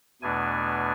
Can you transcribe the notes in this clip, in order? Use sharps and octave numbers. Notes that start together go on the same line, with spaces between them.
E2 B2 A3 D4 G#5